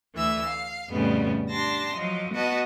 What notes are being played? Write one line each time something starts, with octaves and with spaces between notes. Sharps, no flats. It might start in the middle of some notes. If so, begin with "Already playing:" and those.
D2 E3 E5 E6
F5
F2 A2 C#3 G3 B3 C#4
D4 G4 A5 C6 A#6
F3 F#3 D#5
B3 F#4 D#5 F#5 A5